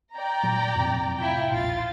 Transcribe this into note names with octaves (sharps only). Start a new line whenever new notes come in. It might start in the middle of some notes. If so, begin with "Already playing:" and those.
D5 G5 A#5
A#2 F#3
F2 A2 C3
E4 F4 G5
E1 A#1 F4 A6